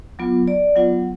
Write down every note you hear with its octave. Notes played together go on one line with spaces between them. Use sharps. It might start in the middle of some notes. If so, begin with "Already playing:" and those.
F#3 B3 F4
D5
F#3 B3 F4 F#5